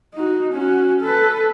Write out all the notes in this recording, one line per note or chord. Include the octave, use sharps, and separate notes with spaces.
D#4 F#4
C#4 F#4
A4 B4